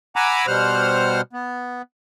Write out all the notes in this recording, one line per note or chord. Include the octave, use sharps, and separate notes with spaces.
F#5 G#5 A#5 B5 D6 E6
B2 G3 C5 F#5 F6
B3